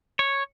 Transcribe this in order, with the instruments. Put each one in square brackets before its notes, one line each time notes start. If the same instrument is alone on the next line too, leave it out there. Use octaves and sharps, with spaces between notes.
[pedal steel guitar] C#5